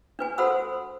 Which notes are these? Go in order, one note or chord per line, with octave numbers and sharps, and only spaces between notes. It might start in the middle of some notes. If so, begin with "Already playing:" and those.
D4 B4 G#5
F#4 A4 C5 F#5 B5 E6